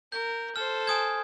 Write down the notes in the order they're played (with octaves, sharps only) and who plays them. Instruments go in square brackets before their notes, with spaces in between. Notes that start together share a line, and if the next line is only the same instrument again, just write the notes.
[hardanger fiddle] A#4 [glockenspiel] G6
[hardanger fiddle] A4 C5 [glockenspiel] F6
[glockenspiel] G#5 D#6 G#6